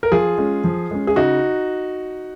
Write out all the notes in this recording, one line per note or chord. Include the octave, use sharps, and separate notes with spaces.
A#4
F3 F4 G#4
G#3 C#4
F3
G#3 C#4
G#4
C#3 D#4 F#4